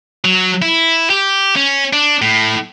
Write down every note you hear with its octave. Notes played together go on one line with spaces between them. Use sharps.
F#3
E4
G4
C#4
D4
A2